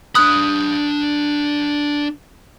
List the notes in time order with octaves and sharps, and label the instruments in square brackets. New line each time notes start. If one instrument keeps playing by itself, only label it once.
[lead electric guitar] D4 B5 [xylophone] D#6 F#6